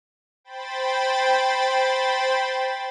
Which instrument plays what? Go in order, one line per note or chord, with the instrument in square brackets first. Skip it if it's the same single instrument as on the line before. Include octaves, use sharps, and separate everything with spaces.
[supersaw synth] C5 G5 B5 A6